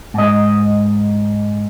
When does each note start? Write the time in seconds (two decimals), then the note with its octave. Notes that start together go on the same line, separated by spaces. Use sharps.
0.14 G#2 D#5